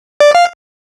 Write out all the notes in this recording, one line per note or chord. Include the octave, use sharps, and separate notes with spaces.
D5
F5